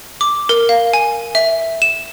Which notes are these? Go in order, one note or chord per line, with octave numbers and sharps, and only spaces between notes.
D6
A#4
F5
G#5
E5
E7